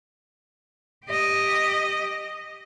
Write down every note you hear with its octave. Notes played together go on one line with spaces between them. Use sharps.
G4 D#5